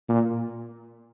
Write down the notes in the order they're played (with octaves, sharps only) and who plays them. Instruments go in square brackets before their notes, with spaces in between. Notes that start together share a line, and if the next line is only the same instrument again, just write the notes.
[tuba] A#2